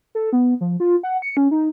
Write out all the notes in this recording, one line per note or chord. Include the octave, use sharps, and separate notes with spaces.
A4
B3
F3
F4
F#5
C#7
C#4
D#4